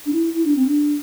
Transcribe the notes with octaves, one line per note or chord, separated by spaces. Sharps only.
D4
E4
E4
D4
C4
D4